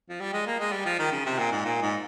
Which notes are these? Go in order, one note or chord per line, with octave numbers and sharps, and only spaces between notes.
F3
G3
G#3
A#3
G#3
G3
F3
D#3
C#3
C3
A#2
G#2
A#2
G#2